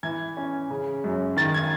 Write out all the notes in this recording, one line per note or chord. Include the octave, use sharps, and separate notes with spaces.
E3 G#6
C#4
C#3
F#2
D#3 A6
G#6